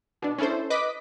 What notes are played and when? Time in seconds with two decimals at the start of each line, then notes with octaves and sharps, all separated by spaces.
0.22 B2 D4
0.38 C#4 D4 E4 A4 C5
0.70 B4 D#5 D6 B6